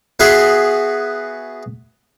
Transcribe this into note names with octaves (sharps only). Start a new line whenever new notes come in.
B3 F#4 G#4 E5 C6